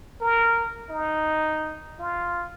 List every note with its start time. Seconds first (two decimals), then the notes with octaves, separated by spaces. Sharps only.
0.21 A#4
0.90 D#4
1.99 F4